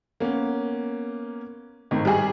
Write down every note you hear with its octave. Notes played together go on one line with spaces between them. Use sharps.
A#3 B3 C#4
G#1 A2 D#3
G3 G#4